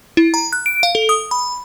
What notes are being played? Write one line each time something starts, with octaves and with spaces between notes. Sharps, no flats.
E4
A#5
F#6
D7
F5
A4
D#6
B5